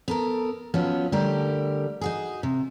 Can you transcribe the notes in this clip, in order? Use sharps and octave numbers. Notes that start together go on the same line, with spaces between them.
B3 A4 A#4
F3 F#3 B3 C#4
D3 G3 A3 G4 A#4
D#4 F#4 G#4
C3